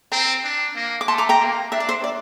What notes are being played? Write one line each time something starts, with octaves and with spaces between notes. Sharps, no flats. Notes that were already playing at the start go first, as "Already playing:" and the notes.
C4 G5 A#5
D4
A#3
D6
A3 A5 C6
A#5 D6
G5 A#5
A#3
D4 E5
D5
C5 E5
D5